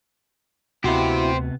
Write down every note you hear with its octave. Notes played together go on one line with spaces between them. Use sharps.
D2 C3 B3 E4 F#4 G4 C5